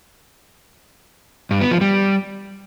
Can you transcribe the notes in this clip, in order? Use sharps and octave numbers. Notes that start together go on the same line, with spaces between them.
G2
B3
F3
G3